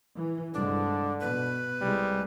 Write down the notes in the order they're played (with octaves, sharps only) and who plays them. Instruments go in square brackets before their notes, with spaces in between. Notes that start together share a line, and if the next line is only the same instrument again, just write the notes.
[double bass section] E3
[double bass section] C2 G2 G#3 [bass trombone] D3 [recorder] D4
[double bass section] B2 [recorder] B4
[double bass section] C2 G#3 [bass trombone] G3